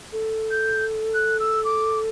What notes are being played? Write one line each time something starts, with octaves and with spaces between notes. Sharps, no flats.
A4
G6
F#6
E6
D6